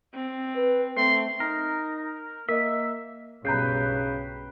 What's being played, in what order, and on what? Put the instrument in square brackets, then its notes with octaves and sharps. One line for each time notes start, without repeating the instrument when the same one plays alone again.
[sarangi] C4
[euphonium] B4
[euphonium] A3 [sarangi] C4 [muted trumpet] C6
[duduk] D#4 [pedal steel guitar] A#4
[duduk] A#3 [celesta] A#4 D#5 [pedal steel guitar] E5
[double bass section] B1 G2 [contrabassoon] C#3 [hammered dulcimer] B4 G5 [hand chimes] A#5 G6 C7